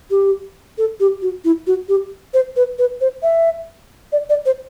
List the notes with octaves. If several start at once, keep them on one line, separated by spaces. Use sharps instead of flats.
G4
A4
G4
F#4
E4
F#4
G4
C5
B4
B4
C5
E5
D5
D5
C5